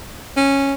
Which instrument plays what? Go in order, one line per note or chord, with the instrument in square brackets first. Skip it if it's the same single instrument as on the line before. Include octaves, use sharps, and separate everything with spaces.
[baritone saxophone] C#4